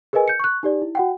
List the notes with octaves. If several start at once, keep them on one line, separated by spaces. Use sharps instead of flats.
G#4 A#4 B4 D#5 G#5
G6 C#7
C#6 F#6
D#4 G4 D5
E4
F#4 F#5 G5